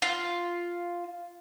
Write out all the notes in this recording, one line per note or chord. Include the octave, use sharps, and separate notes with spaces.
F4